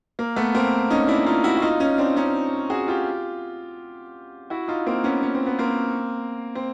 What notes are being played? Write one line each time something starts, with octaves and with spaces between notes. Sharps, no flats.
A#3
A3 B3
A#3 C4
C#4 D#4
D4 E4
D#4 F4
E4 F#4
F#4
D#4 F4
C#4 D#4
C4 D4
C#4 D#4
F#4 G#4
F4 G4
E4 F#4
D#4 F4
A#3 C4
B3 C#4
C#4
C4
B3
A#3 C4
C4